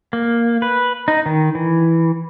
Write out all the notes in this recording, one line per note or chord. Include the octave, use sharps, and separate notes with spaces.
A#3
B4
D#4
D#3
E3